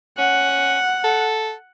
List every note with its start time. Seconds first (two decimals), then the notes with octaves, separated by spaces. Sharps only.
0.18 C#4 F#5
1.04 A4